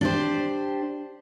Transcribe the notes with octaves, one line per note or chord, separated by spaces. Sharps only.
D4 G4 C5